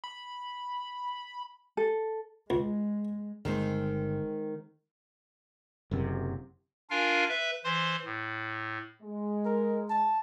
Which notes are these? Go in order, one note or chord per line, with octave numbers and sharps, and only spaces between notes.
B5
A4
C#2 G#3
G1 D#3 G#3 C4
F#1 F#2 C3
D4 F4 A#4 F5 G#5
B4 E5
E3 C5 C6
A2
G#3
A#4
A5